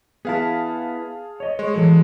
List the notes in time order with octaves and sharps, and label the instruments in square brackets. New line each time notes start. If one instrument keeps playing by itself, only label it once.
[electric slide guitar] B3 E4 [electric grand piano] G#4 F5 A5
[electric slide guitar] C#5 D#5
[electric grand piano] G#3 [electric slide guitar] C#5
[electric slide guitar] E3 F#3 A4